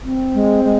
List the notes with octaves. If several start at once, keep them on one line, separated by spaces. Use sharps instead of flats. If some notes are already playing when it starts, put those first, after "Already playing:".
C4
G#3
G#3